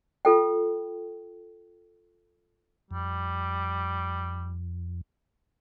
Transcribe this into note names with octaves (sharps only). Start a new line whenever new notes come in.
F4 A4 G5
F2 G3